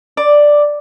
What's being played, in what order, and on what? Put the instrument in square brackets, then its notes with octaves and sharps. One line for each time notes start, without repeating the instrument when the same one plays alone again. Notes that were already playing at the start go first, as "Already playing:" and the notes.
[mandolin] D5